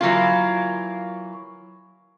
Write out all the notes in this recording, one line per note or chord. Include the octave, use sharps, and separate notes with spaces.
E3 F#3 A#3 F4